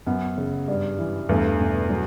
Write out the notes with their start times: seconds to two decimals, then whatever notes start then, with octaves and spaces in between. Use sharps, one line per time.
0.07 F#2 B3
0.38 C#3
0.68 G2
0.99 E3
1.29 E2 G2 A3
1.60 B2
1.90 F#3